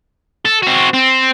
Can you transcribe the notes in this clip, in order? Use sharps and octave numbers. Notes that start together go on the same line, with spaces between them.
A4
C4 F#4
C4